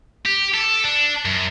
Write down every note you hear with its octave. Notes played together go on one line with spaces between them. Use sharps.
G4
A4
D4
F#2